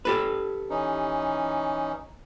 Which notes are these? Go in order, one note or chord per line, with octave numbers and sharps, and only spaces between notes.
G4 A4 B4
E3 C#4 D#4